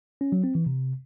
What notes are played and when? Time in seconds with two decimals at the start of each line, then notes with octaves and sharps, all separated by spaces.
0.21 C#4
0.32 F#3
0.44 C4
0.55 E3
0.66 C3